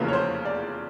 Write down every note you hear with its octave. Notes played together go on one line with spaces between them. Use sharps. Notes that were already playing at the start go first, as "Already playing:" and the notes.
Already playing: F1 E2 C#3 F3 A#3 B4
C#5
C5
D5